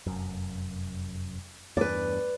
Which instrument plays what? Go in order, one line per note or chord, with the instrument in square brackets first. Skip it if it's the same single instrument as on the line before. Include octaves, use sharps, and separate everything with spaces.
[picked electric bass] F1 F#2
[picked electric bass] E2 G2 [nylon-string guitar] B4 D5